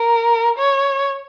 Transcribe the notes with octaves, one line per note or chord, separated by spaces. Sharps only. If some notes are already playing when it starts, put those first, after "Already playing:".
Already playing: A#4
C#5